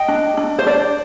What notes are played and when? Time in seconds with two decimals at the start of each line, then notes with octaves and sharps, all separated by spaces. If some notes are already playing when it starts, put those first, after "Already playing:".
Already playing: D#5 G5
0.08 D4
0.37 D4
0.59 C5
0.66 D4 D5